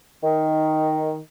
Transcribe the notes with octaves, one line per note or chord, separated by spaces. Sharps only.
D#3